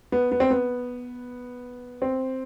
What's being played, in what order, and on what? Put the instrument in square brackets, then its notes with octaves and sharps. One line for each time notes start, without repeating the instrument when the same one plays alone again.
[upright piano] B3
B3
C4
B3
C4